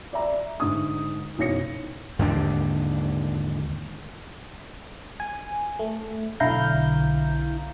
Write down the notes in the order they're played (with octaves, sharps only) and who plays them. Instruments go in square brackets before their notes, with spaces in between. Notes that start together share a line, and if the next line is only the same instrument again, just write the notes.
[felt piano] D5 E5 A#5
G#2 D3 D#6
F#1 B1 C#5 A#6 C#7
[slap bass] D#2 G#2 D3 D4
[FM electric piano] G#5
A3
B1 D3 E4 F5 A#5 G6